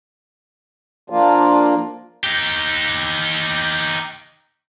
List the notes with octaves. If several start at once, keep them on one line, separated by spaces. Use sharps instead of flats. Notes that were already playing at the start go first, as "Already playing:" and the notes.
F3 A#3 D4 F4
D#4 G4